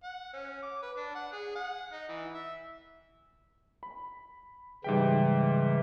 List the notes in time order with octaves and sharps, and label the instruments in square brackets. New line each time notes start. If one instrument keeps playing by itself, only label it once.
[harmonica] F#5
C#4
D6
B4
D4
F#5
G#4
F#5
D#4
E3
E5
[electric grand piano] B5
[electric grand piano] G#2 G3 G5 [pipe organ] C#3 E3 E5